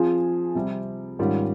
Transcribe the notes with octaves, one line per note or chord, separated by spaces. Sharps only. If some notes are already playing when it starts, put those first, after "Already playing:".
Already playing: F3 C4 F4 G#4
C3 G3 C4
G#2 D#3 G3 C#4 F4